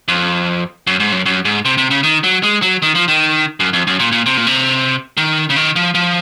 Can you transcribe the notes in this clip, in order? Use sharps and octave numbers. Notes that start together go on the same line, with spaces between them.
F2
F#2
G#2
F#2
F#2
G#2
C3
C3
C#3
D#3
F#3
G#3
F#3
D#3
F3
D#3
F#2
F2
F#2
A#2
A#2
C3
A#2
C3
D#3
C#3
D#3
F3
F3